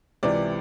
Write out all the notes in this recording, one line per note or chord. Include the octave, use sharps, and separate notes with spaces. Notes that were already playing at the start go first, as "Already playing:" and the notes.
C#2 C3 E3 D5